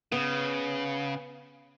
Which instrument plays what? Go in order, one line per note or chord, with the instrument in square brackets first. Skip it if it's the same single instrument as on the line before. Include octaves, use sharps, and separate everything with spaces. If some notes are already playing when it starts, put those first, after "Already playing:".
[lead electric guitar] C#3 [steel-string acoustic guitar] B3